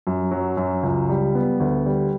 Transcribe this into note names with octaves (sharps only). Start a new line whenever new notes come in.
F#2
F#3
F#2
C#2
G3
B3
D2
G3